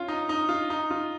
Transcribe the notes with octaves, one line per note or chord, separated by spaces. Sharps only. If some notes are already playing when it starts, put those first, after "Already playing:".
Already playing: C#4 F4
D#4
D#4
F4
D#4
F4